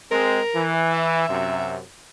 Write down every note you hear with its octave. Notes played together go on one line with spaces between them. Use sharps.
G#3 C4 A#4
E3
E5
F#2 C3